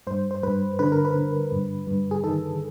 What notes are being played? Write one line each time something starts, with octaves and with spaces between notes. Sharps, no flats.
G2 C5
C5
G2 B4
D3 B4
A#4
B4
D3
G2
G2
G#4
D#3 A4